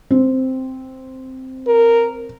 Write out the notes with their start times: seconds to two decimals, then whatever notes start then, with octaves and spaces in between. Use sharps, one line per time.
0.10 C4
1.68 A#4